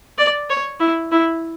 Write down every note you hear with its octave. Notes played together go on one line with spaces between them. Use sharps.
D5
C#5
E4
E4